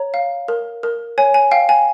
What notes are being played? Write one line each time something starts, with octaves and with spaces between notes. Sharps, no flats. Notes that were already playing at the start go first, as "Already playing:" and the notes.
Already playing: C#5 A#5
F5
A#4
A#4
C#5 G#5
G#5
F5 G5
G#5